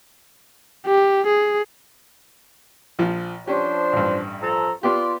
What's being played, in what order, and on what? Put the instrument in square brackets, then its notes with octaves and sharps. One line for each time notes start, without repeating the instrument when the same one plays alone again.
[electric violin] G4
G#4
[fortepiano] A#1 F3
[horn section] F3 D4 C5 [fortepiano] C#4 G4
[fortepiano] A1 G2
[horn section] F3 A4 A#5
[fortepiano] B3 G4 [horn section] F4 D5 C6